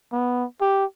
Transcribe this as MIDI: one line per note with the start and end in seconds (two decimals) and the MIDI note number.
0.12 0.45 59
0.61 0.85 67